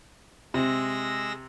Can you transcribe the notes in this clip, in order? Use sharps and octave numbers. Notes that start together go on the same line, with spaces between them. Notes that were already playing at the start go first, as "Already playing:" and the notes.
C3 G#3 E6 A#6